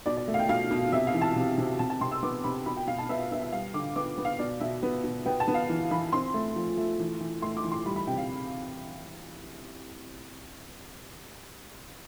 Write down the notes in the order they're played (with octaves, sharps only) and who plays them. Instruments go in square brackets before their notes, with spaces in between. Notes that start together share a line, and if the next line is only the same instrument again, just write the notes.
[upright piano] B2 D5
D5
A3
F5
G5
B2 F5
B2
C3 E5
F5
E3
A5
C3
C3
C3 A5
A5
C3 C6
E6
B3 D6
C3 B5
B2 B5
G5
B2 F5
A5
B3 E5
B3 E5
E5
G3 F5
D3 D6
B3 D6
B3
F5
B2 D5
B2 E5
B3
B2
B3 G5
A5
B3
F5
E3
E3 B5
C4 C6
A3
F3
A3
E3
E3
A3 C6
D6
E3
C6
G3 B5
B5
C3 G5
F5